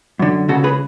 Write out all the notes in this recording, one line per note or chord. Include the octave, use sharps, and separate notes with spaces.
F#2 D3
C#2 C#3 F#4 A4
G#4 B4